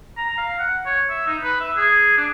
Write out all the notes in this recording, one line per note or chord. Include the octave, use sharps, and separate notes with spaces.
A#5
F5
F#5
C#5
E5
D#4
B4
E5
G#4
D4